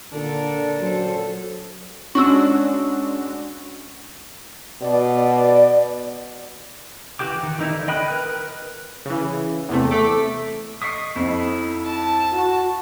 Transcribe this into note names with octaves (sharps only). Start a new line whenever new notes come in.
A#2 D3 D4 A4 A#4
F#3 C#4 A4 C5
G#3 C#4 D4 F#4 C#6 E6
B2 D5
E3 F#4 G4 G5 D6
D#3
E3 D#4 E4
D3
D#5 G5 B5 D#6 F#6
A#4 B4 F#6
C#3 E3
E2 C3 A3
A3 D6 B6
D#5 C#6 D#6 B6 C7
F2 D#4 E4
A5
F#4